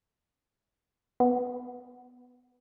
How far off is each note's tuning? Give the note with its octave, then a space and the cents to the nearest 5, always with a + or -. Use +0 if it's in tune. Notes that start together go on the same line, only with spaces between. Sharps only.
B3 +5